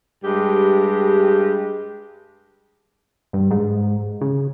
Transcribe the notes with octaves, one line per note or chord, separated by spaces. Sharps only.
G2 G#3 G4
G2
G#2
C#3